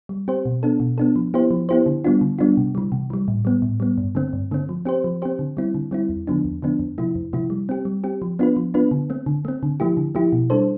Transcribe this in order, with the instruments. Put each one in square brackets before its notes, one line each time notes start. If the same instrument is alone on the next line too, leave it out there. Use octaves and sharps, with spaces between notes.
[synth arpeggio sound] G3
C4 G4 C5
B2
B3 D4 A4
B2
B3 D4 A4
F3
B3 E4 G4 C5
F3
B3 E4 G4 C5
D3
G3 B3 D4 F4
D3
G3 B3 D4 F4
C3
E3 G3
C3
E3 G3
A2
G3 B3
A2
G3 B3
G2
D3 A3 C4
G2
D3 A3 C4
F3
C4 G4 C5
F3
C4 G4 C5
D3
G3 C4 E4
D3
G3 C4 E4
E2
D3 F3 B3 D4
E2
D3 F3 B3 D4
F2
C3 F3 A3 E4
F2
C3 F3 A3 E4
G3
C4 G4
G3
C4 G4
F3
B3 D4 F4 B4
F3
B3 D4 F4 B4
D3
A3 C4
D3
A3 C4
D3
F3 A3 E4 G4
D3
F3 A3 E4 G4
B2
G3 D4 A4 C5